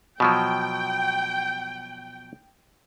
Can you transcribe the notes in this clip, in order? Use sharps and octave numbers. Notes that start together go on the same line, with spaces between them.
B2 F3 F#3 G5